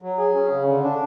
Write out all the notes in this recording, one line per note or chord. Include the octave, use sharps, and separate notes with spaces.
F#3
G#4
C#4
C#3
D3
D4